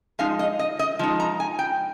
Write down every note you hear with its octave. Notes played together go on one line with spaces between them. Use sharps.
F3 G#3 D#4 F5
D#5
D#5
D#5
F3 G#3 D#4
A#5
G#5
G5